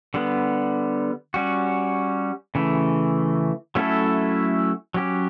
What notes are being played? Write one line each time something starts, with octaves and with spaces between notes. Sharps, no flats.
D3 G3 B3
G3 C#4 F#4
C#3 E3 A3
F#3 A3 C#4 E4 A4
F#3 C#4 G4